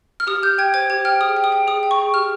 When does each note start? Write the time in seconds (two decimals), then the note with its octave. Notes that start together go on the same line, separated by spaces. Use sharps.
0.20 F6
0.27 G4 D#6
0.43 G4 G6
0.58 G5 G#6
0.74 C5 G#6
0.90 G4 G#6
1.05 G5 F6
1.21 G#4 D#6
1.37 G5
1.44 D#6
1.52 G5
1.67 G#4 D#6
1.83 G5
1.91 C#6
1.98 G#4
2.14 G4 F6